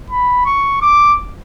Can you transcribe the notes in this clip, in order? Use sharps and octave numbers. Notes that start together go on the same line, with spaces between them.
B5
C#6
D6